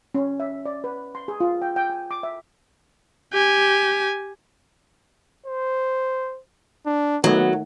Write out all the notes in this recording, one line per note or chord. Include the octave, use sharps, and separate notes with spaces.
C#4
E5
D5
B4
C6
G#4
F4
G5
G5
G#5
D6
E5
G4 G#5
C5
D4
D#3 F#3 A3 B3